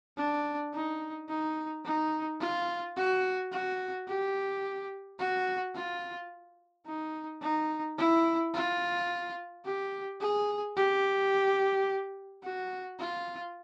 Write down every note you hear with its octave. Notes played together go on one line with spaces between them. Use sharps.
D4
D#4
D#4
D#4
F4
F#4
F#4
G4
F#4
F4
D#4
D#4
E4
F4
G4
G#4
G4
F#4
F4